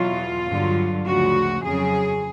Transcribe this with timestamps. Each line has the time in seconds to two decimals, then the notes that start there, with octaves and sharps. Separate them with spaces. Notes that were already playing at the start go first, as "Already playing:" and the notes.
Already playing: E2 B2 F#3 F4
0.47 G2 D3 F#3
1.06 D2 C#3 F3 F#4
1.64 F2 C#3 F#3 G#4